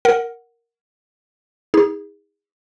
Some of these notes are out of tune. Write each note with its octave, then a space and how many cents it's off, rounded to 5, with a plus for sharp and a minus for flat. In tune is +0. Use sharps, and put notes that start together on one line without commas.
A#4 +0 F#5 +0
D#4 +40 G#4 -30